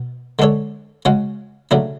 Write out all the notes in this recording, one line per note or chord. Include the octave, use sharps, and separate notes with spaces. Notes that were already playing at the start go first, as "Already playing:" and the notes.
Already playing: B2
D3 G#3 D4 A4 C#5
C#3 G#3 C#4 F#4
C#3 F#3 A3 D4